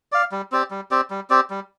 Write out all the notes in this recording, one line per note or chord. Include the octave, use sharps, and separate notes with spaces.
D5 F5
G3
C4 G4 D5
G3
C4 G4 D5
G3
C4 G4 D5
G3